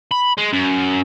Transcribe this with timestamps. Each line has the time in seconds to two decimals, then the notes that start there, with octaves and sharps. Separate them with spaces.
0.11 B5
0.38 G#3
0.53 F#2